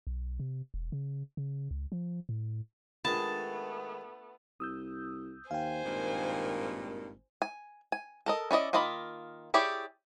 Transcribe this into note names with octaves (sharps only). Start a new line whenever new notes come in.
B1
C3
E1
C#3
C#3
C#2
F3
A2
D#3 G#3 A3 B3 D4 F4 A5 B5
C2 D#6 E6 G6
D#2 C5 F5 G5 G#5
G#1 G2 A#2 D#3
G#5
G#5
A4 A#4 D#5
C#4 E4 D5 D#5
D#3 A#3 F4 D#5 B5
E4 G4 G#4 C#5 D5